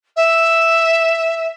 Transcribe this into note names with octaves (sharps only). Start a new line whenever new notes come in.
E5